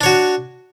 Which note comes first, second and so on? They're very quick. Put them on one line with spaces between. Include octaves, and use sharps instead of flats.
D4 C#5 F#4